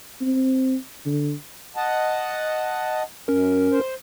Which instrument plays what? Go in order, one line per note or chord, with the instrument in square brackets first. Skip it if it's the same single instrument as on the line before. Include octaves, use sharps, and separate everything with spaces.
[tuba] C4
D3
[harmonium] D#5 F#5 A5
[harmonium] F#2 [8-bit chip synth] C#4 A#4
[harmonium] C5